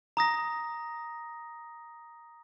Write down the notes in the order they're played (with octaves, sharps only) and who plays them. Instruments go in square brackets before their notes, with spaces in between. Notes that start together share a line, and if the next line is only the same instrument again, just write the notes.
[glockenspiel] A#5 D#6 A#6